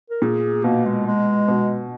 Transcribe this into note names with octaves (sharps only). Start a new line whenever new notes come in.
A#4
A#2 G#4
B2 A#3
G#3
G#3
B2